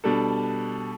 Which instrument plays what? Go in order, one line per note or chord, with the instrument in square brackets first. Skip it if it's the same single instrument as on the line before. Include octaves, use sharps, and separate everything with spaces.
[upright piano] B2 G3 D4 A4